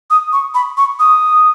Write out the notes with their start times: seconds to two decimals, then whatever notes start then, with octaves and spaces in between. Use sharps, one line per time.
0.10 D#6
0.33 C#6
0.55 B5
0.77 C#6
0.99 D#6